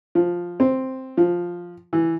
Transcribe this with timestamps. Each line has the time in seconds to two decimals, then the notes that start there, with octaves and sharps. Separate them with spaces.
0.15 F3
0.60 C4
1.17 F3
1.93 E3